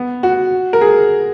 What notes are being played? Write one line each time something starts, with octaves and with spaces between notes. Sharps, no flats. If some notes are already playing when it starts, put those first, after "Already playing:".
Already playing: B3
F#4
A#4
G#4